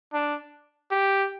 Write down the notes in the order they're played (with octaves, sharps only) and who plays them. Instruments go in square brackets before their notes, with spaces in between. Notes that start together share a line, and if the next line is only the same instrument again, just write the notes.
[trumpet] D4
G4